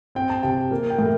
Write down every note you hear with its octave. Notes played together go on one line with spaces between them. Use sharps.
C4 G5
A5
C3 G5
A#3
G5
A2 A#4